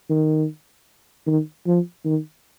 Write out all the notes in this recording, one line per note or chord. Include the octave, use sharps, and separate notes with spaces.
D#3
D#3
F3
D#3